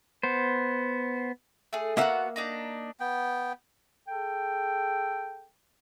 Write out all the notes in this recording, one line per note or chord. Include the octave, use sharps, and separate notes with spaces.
B3 C5
A3 G#4
A#3 B3 F#4 E5 F#5
D4 D#4 A#5
B3 G5
G#4 A4 G5